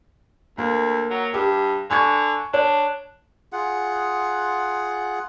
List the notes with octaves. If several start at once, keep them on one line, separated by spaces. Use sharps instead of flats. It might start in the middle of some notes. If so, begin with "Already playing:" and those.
D2 A#3
F#3
G2 G4
D3 G#5 C#6 G#6
D4 C#5
F4 G#4 F#5